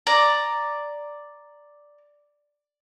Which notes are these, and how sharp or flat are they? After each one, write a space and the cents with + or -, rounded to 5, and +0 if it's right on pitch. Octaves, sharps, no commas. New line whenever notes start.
D5 +0 A#5 +0